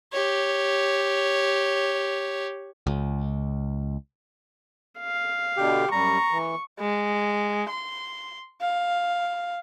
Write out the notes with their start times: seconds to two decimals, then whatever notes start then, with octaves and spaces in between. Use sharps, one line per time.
0.13 G4 C#5
2.87 C#2
5.00 F5
5.57 B2 D3 G4
5.91 F#2 G3 A#5 C#6
6.31 E3
6.79 G#3
7.69 C6
8.62 F5